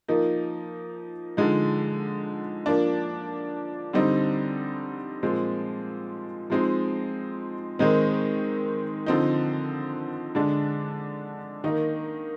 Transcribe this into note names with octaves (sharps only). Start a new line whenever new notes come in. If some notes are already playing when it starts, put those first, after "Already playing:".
F3 A#3 D#4
D3 F3 G#3 D#4
F3 A#3 D4
D3 G3 C4 D#4
A#2 F3 G#3 C4
F3 G#3 C4 D#4
D#3 G#3 C4 D#4
D3 F3 C4 D#4
D3 G#3 D4
D#3 A#3 D#4